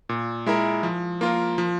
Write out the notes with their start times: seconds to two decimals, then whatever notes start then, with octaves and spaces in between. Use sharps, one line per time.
0.09 A#2
0.46 G#3 E4 A#4
0.83 F3
1.21 A#3 F4 A#4
1.58 F3